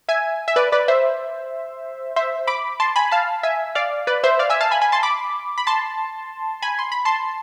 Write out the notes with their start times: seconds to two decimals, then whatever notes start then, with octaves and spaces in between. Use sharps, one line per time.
0.09 E5 G#5
0.48 E5
0.56 B4 D5
0.72 B4 D5
0.88 C5 E5
2.16 C5 E5
2.47 B5 D6
2.80 A5 C6
2.96 G#5 B5
3.11 F5 A5
3.43 E5 G#5
3.75 D5 F5
4.07 B4 D5
4.24 C5 E5
4.39 D5 F5
4.50 E5 G#5
4.61 F5 A5
4.71 G#5 B5
4.81 G#5 B5
4.92 A5 C6
5.03 B5 D6
5.58 B5
5.67 A5 C6
6.62 G#5 B5
6.79 C6
6.92 B5
7.05 A5 C6